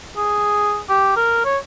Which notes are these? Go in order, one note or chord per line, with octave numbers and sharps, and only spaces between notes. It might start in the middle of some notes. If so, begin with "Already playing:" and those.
G#4
G4
A#4
C#5